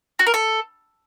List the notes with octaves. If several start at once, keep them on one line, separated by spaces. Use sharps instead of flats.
F#4
A#4
A4